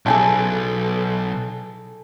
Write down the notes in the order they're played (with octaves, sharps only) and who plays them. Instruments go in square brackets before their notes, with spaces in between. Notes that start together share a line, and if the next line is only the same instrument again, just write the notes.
[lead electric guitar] B1 [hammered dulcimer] A4 G#5 A5